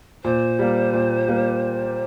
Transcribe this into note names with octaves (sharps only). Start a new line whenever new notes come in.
A#2 C5
G3 A#3
A#2
G3 A#3